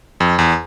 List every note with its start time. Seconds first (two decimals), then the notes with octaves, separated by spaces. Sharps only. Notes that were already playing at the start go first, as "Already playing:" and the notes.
0.20 F2
0.39 E2